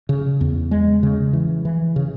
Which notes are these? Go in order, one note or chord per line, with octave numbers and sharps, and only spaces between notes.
C#3
E2
G#3
C#3
E3
E3
C#3